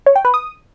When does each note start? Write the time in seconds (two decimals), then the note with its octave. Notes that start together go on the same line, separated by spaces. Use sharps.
0.06 C#5
0.16 G5
0.25 B4
0.34 D#6